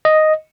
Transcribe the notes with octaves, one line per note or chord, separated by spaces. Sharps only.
D#5